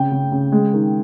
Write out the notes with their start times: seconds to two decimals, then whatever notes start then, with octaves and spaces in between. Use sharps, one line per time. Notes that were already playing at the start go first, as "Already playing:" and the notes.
Already playing: C#3 G5
0.12 C#3
0.32 C#3
0.52 G#3
0.73 D#3